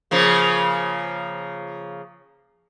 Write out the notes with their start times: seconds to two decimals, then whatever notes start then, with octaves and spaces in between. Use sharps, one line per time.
0.11 C#3 F3 A#3